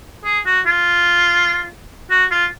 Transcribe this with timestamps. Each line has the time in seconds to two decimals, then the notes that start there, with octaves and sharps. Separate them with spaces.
0.25 G#4
0.46 F#4
0.66 F4
2.11 F#4
2.31 F4